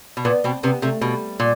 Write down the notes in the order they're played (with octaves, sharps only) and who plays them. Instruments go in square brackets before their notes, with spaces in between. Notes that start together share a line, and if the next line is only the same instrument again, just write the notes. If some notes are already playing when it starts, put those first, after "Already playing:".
[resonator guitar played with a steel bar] B2
[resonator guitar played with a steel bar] A#2 [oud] B3
[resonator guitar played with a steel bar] B2 [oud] C4
[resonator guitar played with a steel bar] C3 [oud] B3
[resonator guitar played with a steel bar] C3 [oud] A3
[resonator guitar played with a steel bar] B2 [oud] G3
[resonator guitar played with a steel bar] A#2